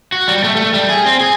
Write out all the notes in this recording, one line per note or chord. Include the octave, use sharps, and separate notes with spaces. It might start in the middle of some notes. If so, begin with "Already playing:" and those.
F#4
G3
A3
A3
G3
G#4
C4
G#4